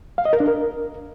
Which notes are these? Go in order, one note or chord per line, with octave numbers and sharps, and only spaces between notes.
F5
D#5
A#4
D4
A#4